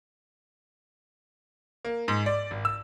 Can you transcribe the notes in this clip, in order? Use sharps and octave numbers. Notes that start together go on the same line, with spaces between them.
A#3
G#2
D5
G#1
E6